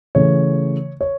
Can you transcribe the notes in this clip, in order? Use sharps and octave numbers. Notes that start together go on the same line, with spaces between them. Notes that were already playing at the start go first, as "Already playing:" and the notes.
C#3 E3 A3 C#5
C#5